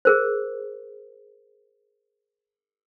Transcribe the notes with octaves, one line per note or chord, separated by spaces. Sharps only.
G#4 A#4 C5